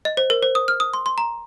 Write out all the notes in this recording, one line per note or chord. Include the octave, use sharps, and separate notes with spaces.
D#5
C5
A#4
C5
D#6
F6
D#6
C6
C6
A#5